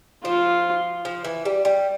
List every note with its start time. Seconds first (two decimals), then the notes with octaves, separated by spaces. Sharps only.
0.25 F3 F4
1.05 F3
1.25 E3
1.45 G3
1.65 G3